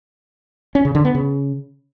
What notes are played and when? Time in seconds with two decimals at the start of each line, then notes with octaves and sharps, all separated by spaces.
0.75 C#4
0.85 C#3
0.95 D3
1.05 B3
1.15 C#3